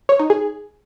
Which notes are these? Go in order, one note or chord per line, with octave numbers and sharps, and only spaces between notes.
C#5
D#4
G#4